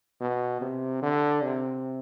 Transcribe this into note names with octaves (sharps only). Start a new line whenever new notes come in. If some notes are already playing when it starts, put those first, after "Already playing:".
B2
C3
D3
C3